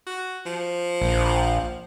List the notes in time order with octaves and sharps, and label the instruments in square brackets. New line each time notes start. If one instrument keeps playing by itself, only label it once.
[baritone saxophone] F#4
F3
[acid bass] A#1